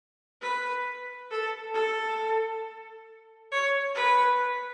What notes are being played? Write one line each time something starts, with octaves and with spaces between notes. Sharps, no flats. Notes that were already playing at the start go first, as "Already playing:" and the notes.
B4
A4
A4
C#5
B4